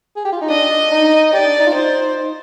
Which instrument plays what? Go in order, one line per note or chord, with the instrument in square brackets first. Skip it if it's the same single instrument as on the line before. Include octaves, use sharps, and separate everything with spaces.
[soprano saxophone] G#4
G4
F4
D#4
[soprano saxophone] D4 [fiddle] D#5
[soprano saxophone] D4
D#4
[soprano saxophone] G4 [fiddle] D5
[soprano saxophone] D4
D#4
F4
[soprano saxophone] D#4 [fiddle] C5
[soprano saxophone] D#4